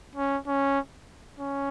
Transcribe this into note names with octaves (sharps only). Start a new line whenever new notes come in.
C#4
C#4
C#4